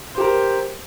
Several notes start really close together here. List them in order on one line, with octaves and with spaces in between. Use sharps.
C5 G4 A#4